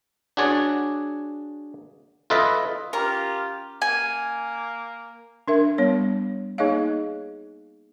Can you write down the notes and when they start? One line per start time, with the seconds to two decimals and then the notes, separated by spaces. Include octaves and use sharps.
0.37 D4 F#4 G#4 C#5 D5
2.30 F4 A4 B4 D#5 E5
2.93 C#4 F4 G4 A#4
3.82 A#3 G#5
5.48 D4 A#4 E5
5.78 G3 B3 C#5
6.58 A#3 D#4 G#4 C#5 D#5 F5